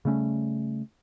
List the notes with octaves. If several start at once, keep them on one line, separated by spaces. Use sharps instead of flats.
C#3 G3 A3 C#4